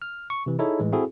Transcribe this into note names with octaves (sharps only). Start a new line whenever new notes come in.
F6
C#6
C3 E3
D#4 E4 G#4 A4 C#5
A2 E3 G#3
C4 E4 F#4 G#4 A4